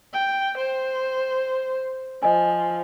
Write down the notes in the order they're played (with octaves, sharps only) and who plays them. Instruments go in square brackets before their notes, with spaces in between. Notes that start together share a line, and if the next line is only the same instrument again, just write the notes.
[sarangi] G5
C5
[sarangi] F3 [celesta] D#5 G#5